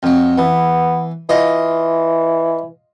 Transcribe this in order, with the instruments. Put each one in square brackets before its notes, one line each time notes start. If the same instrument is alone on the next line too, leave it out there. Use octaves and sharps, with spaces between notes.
[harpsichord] F2 F#3
[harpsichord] E3 [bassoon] B3
[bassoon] E3 [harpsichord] F4 D#5